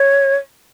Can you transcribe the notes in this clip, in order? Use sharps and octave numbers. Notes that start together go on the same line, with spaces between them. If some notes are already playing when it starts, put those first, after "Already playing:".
Already playing: C#5